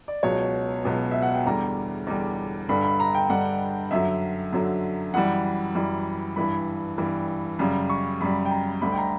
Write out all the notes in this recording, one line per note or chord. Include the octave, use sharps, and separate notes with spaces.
D5
C#2 B2 F#3 C#5
C#2 B2 F#3
E5
F#5
G5
E2 D3 G3 A#5
E2 D3 G3
G2 D3 G3 B5
B5
A#5
G5
G2 D3 G3 F#5
F#2 D3 F#3 E5
F#2 D3 F#3
F#2 E3 G3 F#5
F#2 E3 G3
G2 E3 G3 B5
G2 E3 G3
F#2 C#3 G3
C#6
F#2 C#3 G3 B5
G5
A#5
D2 D3 G3 B5
G5
A#5